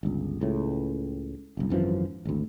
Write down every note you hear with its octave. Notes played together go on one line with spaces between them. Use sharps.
G1 C#2
C#2 A2
F#1 C2
G#1 F#2 E3 F3
G#1 D2